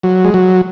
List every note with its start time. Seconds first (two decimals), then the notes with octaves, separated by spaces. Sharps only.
0.03 F#3
0.24 G#3
0.34 F#3